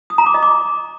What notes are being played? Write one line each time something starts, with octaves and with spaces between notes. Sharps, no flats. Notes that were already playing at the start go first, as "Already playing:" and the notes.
D#6
A#5
D6
D#5
D6